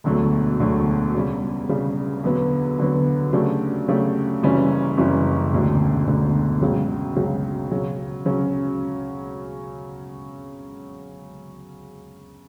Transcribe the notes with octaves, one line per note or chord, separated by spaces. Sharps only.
E1 D2 D3 F#3 A3
E1 D2 D3 F#3 A3
E2 C#3 G3
E2 C#3 G3
E2 D3 F#3 B3
E2 D3 F#3 B3
C#3 F#3 A3 D4 G4
C#3 F#3 A3 D4 G4
F#1 F#2 E3 G3 C#4
F#1 F#2 E3 G3 C#4
E1 D2 D3
E1 D2 D3
C#2 C#3 F#3
C#2 C#3 F#3
C#3 F#3 C#4
C#3 F#3 C#4